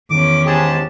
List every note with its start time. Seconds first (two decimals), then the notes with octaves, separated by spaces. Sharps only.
0.10 E2 D#3 C#4 D6
0.46 G#2 G4 G#4 A5